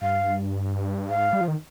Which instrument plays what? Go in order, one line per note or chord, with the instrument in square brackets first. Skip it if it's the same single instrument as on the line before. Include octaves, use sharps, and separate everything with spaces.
[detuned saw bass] G2 [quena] F5
[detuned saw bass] G#2 [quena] F5
[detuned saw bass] G3
F3
D#3